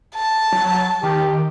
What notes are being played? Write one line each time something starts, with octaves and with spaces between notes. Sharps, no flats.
A5
F#3
D#3 G4